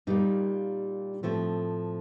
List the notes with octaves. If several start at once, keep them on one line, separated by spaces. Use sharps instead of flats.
A#2 G3 A#3 D#4
A2 F3 A3 C4